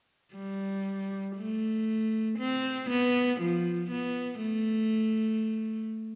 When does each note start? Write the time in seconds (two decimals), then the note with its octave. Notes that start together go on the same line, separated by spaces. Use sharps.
0.34 G3
1.37 A3
2.39 C4
2.90 B3
3.41 F3
3.91 B3
4.43 A3